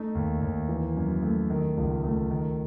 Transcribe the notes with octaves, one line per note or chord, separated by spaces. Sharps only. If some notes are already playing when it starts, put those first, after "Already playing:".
Already playing: A3 D#4
D#2
D#2
E3
F#2
A3
D#3
C#2
A3
D#3